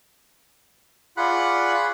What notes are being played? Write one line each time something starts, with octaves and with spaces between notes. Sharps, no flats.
F4 G#4 C#5 D5 F#5 B5 F#6